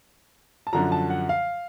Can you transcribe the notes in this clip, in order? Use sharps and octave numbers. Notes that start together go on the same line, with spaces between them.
A5
F#2 D3 F3 A#5
A5
F#5
F5